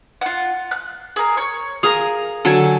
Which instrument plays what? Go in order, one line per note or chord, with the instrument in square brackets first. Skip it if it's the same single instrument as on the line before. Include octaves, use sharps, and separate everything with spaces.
[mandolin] F4 F#5
F#6
G#4 A#4
C#5
[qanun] G#4 F5 [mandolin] A#4 D#6
[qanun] D3 F#3 [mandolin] A4 G#5